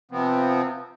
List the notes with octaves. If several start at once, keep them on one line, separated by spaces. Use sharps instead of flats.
C3 F3 B3 C4